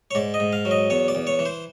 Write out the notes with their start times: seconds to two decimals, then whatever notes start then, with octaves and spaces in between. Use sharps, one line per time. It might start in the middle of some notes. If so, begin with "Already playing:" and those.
0.11 C#5
0.15 G#2 D5
0.34 D#5
0.40 G#2
0.53 F5
0.65 F#3
0.71 D#5
0.90 E2 C#5
1.08 D5
1.15 E2
1.27 C#5
1.39 E3
1.46 C5